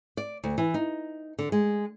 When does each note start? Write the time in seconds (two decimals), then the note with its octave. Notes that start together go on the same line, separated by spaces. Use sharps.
0.17 D5
0.44 D2
0.58 E3
0.74 D#4
1.39 D3
1.52 G#3